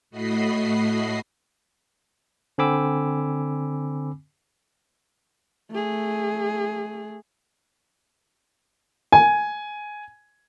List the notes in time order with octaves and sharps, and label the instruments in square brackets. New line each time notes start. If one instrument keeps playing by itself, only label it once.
[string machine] A2 A3 F#4 D#5 B5 C7
[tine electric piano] D3 C4 G#5 B5 D6 E6
[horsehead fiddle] A3 G#4
[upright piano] G#5